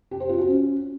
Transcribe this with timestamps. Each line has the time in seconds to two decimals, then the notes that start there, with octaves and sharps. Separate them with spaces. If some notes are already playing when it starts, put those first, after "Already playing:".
0.11 G4
0.20 C5
0.29 F4
0.38 F#4
0.47 C#4